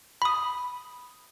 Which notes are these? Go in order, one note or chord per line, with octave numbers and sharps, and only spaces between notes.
B5 D#6